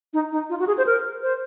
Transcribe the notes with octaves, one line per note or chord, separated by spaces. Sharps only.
D#4
D#4
F4
F#4
G#4
C5
A#4
C5